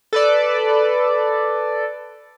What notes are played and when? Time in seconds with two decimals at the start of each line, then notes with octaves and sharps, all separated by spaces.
0.13 A4 B4 D5